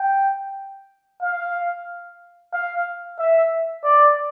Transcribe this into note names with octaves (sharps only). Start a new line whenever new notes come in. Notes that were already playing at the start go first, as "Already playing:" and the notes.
Already playing: G5
F5
F5
E5
D5